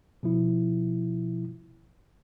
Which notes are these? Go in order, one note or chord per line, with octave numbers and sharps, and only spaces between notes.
B2 F3 E4